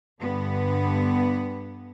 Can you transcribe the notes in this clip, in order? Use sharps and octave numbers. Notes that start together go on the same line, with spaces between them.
G2 D3 B3